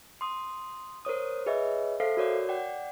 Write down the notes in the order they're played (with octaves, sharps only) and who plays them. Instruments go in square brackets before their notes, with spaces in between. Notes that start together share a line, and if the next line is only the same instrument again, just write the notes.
[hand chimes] C6 D#6
A#4 C5 C#5 D#6
G#4 B4 C#5 D#5 E5
A4 C5 E5 F5 C7
F#4 A#4 C#5 D5
D5 F#5 G5